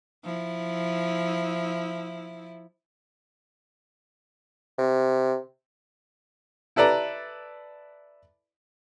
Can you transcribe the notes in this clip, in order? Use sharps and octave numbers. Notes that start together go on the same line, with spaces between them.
F3 E4
C3
E4 A4 B4 D5 A#5